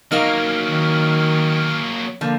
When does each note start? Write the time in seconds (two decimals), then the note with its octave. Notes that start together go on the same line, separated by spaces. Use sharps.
0.11 F#3 A#3 D#4 A#4 F5 F6
0.65 D#3
2.21 D3 F3 A#3